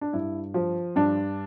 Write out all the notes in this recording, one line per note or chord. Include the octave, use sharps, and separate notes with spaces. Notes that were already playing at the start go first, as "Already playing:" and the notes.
D4
G2 E4
F3
G2 D4